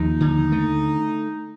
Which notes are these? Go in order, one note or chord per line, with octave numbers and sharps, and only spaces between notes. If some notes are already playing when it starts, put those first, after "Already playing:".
Already playing: D#2 F3 D#4
D3
A3